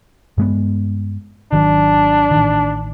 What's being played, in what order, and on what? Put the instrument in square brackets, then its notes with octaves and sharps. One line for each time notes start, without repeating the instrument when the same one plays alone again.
[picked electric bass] G2 G#3 B3
[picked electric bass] G#1 D#3 F#3 [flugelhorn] D4
[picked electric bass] A1 D#3